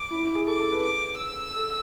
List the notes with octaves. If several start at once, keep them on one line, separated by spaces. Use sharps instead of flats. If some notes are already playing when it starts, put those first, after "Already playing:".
Already playing: D6
E4
E4
G#4
A4 D6
A4
B4
D6
E6
A4